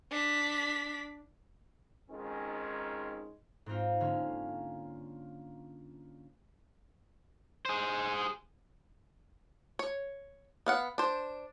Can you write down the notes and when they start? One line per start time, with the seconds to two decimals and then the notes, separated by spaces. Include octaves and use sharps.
0.11 D4 B6
2.10 F2 D#3 G#3 C#4 D#4
3.66 G#2 C4 D#4 F4
4.00 D3 A#3 C#4
7.65 G#4 C5
9.79 C#5
10.66 B3 F5 F#5
10.98 D4 C5